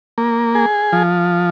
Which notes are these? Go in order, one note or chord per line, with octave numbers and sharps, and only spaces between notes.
A#3
G#4
F3